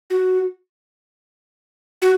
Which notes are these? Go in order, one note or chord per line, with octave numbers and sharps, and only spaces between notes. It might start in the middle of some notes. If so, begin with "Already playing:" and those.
F#4
F#4